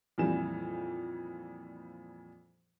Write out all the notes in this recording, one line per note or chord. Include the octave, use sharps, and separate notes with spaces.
F2 A#2 E3 G3 E7